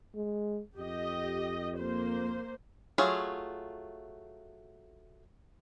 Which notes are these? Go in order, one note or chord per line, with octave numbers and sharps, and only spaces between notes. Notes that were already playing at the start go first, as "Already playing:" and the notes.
G#3
F2 G4 D#5
A#3 C5
F#3 A3 F4 G#4